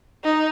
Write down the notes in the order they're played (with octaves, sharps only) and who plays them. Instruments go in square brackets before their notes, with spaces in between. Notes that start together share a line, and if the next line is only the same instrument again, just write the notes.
[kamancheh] D#4